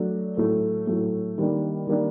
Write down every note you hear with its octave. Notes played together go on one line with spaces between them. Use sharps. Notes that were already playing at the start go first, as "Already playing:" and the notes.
Already playing: F#3 A3 D4
A2 F#3 A3
A2 F#3 A3
D#3 G3 A#3 D4
D#3 G3 A#3 D4